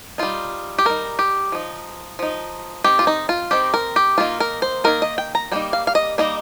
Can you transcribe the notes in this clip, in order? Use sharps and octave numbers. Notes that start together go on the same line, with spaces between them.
G3 D#4 F4
G4
G3 D#4 A#4
G4
F3 D#4
F3 D#4
D#3 C4 D#4 G4
F4
D#4
F4
D#3 C4 D#4 G4
A#4
G4
D#3 A#3 D#4 F4
A#4
C5
D#3 A#3 D#4 A#4
D#5
G5
A#5
G3 A#3 D#4 G5
F5
F5
D#5
G3 A#3 D#4 D#5